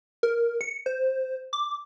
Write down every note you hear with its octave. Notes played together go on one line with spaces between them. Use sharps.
A#4
C#7
C5
D6